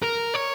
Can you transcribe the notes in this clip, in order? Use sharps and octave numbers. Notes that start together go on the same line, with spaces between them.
A#4
C#5